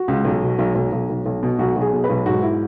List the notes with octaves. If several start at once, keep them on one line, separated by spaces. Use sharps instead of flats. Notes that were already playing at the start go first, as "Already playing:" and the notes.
Already playing: F#4
C#2
B1
B2
B1
B1
B1
B1
B1
B2
B1 F#4
B1
G#4
B2
B4
B1
G#2 F#4
E4